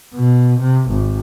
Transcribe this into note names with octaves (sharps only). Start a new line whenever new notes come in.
B2
C3
G#1